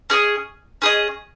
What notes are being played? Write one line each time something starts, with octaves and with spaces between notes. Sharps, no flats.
C#4 G#4 D#5
C#4 G#4 D#5